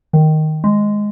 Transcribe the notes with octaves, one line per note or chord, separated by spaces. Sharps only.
D#3
G#3